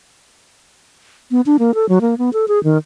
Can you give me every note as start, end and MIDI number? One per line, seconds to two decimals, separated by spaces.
1.31 1.41 59
1.46 1.57 62
1.59 1.74 58
1.74 1.88 69
1.89 1.99 54
2.01 2.18 58
2.18 2.30 59
2.33 2.45 69
2.48 2.62 68
2.64 2.78 51